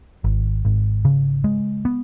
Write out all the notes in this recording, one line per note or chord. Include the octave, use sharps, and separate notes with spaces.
G#1
G#1
C#3
G#3
B3